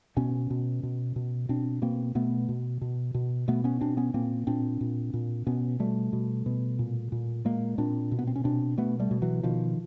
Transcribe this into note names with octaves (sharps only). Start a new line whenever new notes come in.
B2 B3 C#4
B2
B2
B2
B2 C4 D4
B2 A#3 C4
B2 A3 B3
B2
B2
B2
B2 A3 B3
B3 C#4
B2 C4 D4
B3 C#4
A#2 A#3 C4
A#2 C4 D4
A#2
A#2
B2 B3 C#4
B2 G3 A3
B2
B2
A#2
A#2
A#2 G#3 A#3
A#2 C4 D4
B2
B3
C4
C#4
B2 C4 D4
B2 A3 B3
G3 A3
B2
E3 F#3
B2 D#3 F3